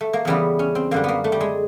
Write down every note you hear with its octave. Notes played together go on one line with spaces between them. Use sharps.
A3
A#3
E2 C#3 E3 G3 B3
C#4
C4
F#2 D3 G3 A#3
A#3 B3
A3
G3
G#3